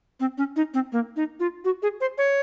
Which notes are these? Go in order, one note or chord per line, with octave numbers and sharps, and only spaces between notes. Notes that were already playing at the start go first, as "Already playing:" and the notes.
C4
C#4
D#4
C4
A#3
D#4
F4
F#4
G#4
C5
C#5